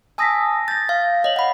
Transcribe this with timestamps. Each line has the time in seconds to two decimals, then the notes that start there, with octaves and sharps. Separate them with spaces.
0.18 G#5 A5 D#6 E6 A#6 B6
0.68 G6 A6 A#6
0.89 F5
1.24 C#5 D#5 F#7
1.36 F#5 B5